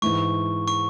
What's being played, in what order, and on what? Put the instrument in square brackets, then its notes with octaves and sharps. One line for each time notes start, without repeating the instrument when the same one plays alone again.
[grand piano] G#2 E3 G#3 [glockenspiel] C#6
[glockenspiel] C#6